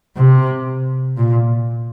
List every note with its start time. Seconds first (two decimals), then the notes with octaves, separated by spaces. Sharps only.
0.17 C3
1.17 A#2